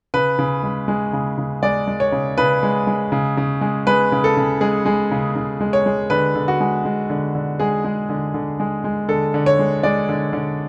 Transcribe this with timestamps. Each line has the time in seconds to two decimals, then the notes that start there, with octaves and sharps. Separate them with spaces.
0.14 C#3 B4
0.39 C#3
0.63 G#3
0.88 G#3
1.13 C#3
1.38 C#3
1.63 G#3 D5
1.87 G#3
2.00 C#5
2.12 C#3
2.38 C#3 B4
2.63 G#3
2.87 G#3
3.12 C#3
3.37 C#3
3.61 G#3
3.87 G#3 B4
4.12 C#3
4.24 A4
4.37 C#3
4.61 G#3 G#4
4.86 G#3
5.11 C#3
5.36 C#3
5.61 G#3
5.73 C#5
5.86 G#3
6.10 D3 B4
6.35 D3
6.48 F#4
6.60 G#3
6.85 G#3
7.10 D3
7.35 D3
7.59 G#3 G#4
7.85 G#3
8.09 D3
8.34 D3
8.60 G#3
8.84 G#3
9.09 D3 A4
9.34 D3
9.46 C#5
9.59 G#3
9.83 G#3 D5
10.09 D3
10.33 D3